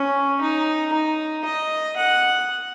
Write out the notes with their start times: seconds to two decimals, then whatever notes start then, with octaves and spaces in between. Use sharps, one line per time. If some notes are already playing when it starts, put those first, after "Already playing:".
Already playing: C#4
0.41 D#4
0.92 D#4
1.44 D#5
1.96 F#5